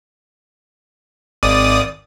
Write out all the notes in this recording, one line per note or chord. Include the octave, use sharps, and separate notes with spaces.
G#1 D5 D#6